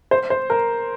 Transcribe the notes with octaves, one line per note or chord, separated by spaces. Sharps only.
C5
C5
A#4